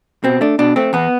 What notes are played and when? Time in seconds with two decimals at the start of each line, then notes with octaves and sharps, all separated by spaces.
0.24 B2 C4
0.41 A3 D4
0.59 B2 D4
0.76 A3 C4
0.93 E2 B3